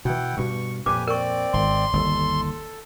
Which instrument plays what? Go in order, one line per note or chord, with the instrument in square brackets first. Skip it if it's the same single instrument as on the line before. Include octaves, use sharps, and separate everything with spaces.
[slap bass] B2 E3 [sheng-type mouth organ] E4 F#5 G5
[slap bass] G2 B2 [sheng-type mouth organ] C#6
[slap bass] F2 A#2 [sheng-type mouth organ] G4 B4 G#5 [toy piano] D6
[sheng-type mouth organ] C4 D5 [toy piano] A#4 C#6
[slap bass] G#1 [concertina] C6
[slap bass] G1 D#2 [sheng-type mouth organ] A4